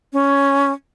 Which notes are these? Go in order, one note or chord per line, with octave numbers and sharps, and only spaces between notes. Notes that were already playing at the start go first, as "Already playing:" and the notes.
C#4